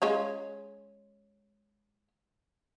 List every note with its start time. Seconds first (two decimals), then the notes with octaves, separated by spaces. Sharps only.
0.02 G#3 C#4 F4